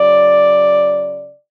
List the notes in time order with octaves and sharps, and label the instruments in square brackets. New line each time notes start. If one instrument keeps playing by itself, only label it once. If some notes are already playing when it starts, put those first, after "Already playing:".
Already playing: [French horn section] C#3 F#3 D5